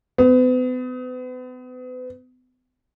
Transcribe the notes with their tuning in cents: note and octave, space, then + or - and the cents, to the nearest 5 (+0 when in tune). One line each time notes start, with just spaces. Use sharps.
B3 +40